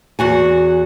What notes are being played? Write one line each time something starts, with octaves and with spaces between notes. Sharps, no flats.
E2 F#4 G#5